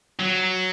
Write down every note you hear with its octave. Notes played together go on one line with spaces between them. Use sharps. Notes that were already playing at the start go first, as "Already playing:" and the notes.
F#3